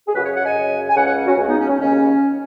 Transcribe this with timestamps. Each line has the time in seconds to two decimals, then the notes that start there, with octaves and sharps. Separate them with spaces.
0.08 G#4
0.14 F#2 F#4 B4
0.18 C#3
0.24 G#4 C#5
0.34 C#5 F#5
0.45 D#5 G#5
0.55 F#2 C#3
0.89 G#5
0.96 C#2 C#3 C#5 F#5
1.06 C#5 F#5
1.27 C#4 F#4
1.37 C#2 C#3 C#4 F#4
1.47 B3 D#4
1.58 C#4
1.68 C#4
1.79 D#2 C#3 C#4